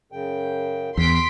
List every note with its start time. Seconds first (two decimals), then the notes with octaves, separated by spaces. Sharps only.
0.12 F#2 C#3 G5
0.98 E2 C6 B6 D7